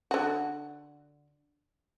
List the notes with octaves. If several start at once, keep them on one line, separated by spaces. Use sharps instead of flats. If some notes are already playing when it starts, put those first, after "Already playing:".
D3 F#4